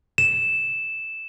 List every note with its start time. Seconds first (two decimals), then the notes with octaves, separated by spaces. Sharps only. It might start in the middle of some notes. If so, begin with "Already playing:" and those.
0.18 E7